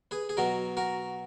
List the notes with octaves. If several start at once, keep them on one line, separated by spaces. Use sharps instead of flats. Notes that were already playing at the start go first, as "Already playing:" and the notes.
G#4 B4
G#4
B2 F#3 F#4 A#4
F#4 A#4